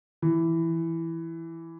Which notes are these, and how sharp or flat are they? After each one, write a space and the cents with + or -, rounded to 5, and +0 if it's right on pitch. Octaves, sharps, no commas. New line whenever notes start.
E3 +5